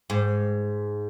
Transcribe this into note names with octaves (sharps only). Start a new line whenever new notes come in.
G#2